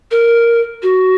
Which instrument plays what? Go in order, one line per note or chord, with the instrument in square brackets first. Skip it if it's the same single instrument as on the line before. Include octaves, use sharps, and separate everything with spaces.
[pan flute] A#4
F#4